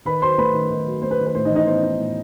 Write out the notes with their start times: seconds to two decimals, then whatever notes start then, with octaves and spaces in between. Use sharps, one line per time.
0.05 D#3 B4 B5
0.22 F#3 C5 C6
0.38 A3 B4 B5
0.53 D#3
0.70 D#3
0.87 F#3
1.02 A3 C5
1.11 B4
1.19 D#3
1.27 B4
1.35 A2 C5
1.45 D#4 D#5
1.50 E3
1.56 D#4 D#5
1.66 B3 C5
1.83 D#4
1.98 A2